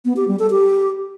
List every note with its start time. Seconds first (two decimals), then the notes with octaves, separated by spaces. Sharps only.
0.05 B3
0.17 G4
0.28 G3
0.39 A4
0.51 G4